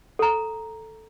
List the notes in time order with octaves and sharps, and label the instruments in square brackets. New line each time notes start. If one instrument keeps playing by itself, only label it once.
[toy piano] A4 A#5